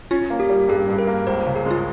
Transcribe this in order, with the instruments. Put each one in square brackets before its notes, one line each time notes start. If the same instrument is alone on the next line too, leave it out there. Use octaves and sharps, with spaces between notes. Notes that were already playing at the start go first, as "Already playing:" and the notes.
[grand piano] C#4 [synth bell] F4
[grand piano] A#3
[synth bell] G4
[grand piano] G3
[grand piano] G2 [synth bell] G#4
[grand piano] G2
[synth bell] A#4
[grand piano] A#3
[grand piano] C#2 [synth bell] C5
[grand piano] C#3
[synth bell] G#4
[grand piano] G#3 [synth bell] F4